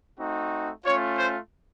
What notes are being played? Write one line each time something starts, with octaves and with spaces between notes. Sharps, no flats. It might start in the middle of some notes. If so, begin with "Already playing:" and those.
A3 C4 D#4 F#4
A3 C#4 F4 C#5
C5